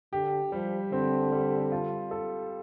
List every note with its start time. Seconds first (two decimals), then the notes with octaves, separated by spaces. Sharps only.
0.12 D3 G4
0.52 F3 G3
0.92 D3 C4
1.32 G3
1.72 F4
2.11 A4